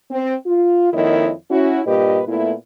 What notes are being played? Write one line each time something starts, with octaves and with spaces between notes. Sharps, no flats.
C4
F4
F2 D#3 A#3 E4 C#5 D#5
C#4 E4 F#4
G2 A#2 G4 B4 D#5
A#2 A3 B3 E4